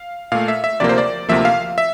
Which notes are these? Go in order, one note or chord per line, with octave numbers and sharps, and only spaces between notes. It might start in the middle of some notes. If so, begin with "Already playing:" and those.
Already playing: F5
A#2 A3 F5
E5
E5
D2 C3 F3 A#3 D5
C5
D5
D2 C3 F3 A#3 E5
F5
E5